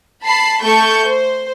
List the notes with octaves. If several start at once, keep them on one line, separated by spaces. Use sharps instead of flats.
A5 B5 C7
A3 A5 C#6 G6
C5